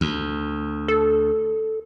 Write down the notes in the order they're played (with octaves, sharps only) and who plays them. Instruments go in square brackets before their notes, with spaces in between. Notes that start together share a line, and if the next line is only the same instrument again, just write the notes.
[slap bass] D2
[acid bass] A4